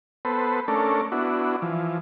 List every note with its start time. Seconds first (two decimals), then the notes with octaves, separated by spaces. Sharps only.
0.25 B3 A4 B4 C5
0.68 A3 C#4 D4 A4 A#4
1.12 B3 D4 E4 F#4
1.62 E3 F3